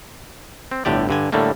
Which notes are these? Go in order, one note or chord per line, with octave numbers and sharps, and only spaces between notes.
C4
G1 A2 D3 G4 D5
G2 D3 G#5
A2 D3 G3 A3 A#3